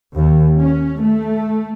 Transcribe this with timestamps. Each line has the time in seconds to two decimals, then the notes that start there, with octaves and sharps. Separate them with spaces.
0.14 D#2
0.59 C#4
1.02 A3